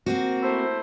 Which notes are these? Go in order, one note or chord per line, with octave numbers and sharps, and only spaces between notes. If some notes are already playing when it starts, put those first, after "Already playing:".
A#3 C4 F#4
A3 E4 C5